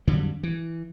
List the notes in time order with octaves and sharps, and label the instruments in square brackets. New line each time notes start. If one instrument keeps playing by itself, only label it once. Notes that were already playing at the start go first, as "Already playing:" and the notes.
[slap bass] F2 D3 F#3 G3
E3